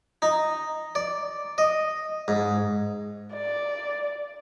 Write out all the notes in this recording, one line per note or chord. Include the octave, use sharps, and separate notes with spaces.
D#4
D5
D#5
G#2
D5